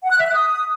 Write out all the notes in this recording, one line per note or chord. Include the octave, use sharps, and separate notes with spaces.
F#5
F#6
E5
F#6
D#6